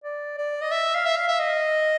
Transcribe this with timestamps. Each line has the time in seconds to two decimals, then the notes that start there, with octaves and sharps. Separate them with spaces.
0.04 D5
0.38 D5
0.61 D#5
0.72 E5
0.95 F5
1.06 E5
1.16 F5
1.28 E5
1.39 D#5